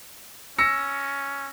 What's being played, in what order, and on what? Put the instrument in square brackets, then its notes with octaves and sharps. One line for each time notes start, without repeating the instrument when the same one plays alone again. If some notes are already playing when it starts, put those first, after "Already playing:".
[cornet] C#4 [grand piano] E6 A#6 C#7